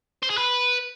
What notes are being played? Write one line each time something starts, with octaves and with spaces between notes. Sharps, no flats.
C5
G#4
B4